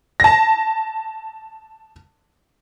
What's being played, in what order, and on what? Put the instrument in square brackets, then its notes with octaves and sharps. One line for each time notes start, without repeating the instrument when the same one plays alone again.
[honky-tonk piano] A5 A#6